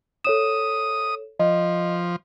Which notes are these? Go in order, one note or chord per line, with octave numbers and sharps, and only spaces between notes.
A4 C#5 D#6 E7
F3 D#5